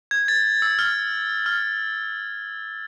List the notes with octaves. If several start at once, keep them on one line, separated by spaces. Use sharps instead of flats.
G#6
A6
E6
F6
F6